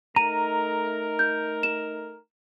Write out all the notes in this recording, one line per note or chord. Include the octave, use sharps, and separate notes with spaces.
A3 D#4 A#4 A#5 D#7
G6
E7